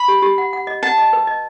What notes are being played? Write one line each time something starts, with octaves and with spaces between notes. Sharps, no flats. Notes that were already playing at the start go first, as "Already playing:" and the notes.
Already playing: B5
G4
G4
F#5
F#5
D#5
F#5 A5
D#5
B4
D#5